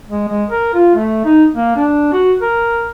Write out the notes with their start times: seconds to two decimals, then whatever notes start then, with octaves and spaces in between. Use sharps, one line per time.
0.10 G#3
0.29 G#3
0.50 A#4
0.74 F4
0.95 A3
1.25 D#4
1.55 A#3
1.76 D4
2.13 F#4
2.42 A#4